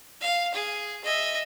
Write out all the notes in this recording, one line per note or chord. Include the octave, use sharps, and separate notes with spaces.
F5
G#4
D#5 E5